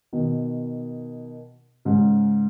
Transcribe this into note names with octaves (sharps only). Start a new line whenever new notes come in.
B2 D#3
G#2 C#3